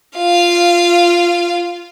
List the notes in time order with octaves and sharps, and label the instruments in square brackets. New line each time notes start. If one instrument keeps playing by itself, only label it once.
[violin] F4 F5